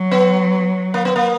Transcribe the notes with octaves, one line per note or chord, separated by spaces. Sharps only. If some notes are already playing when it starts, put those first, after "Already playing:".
Already playing: F#3
B3
A#3
B3
A#3